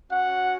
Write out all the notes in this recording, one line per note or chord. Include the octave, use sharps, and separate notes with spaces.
C#4 F#4 F#5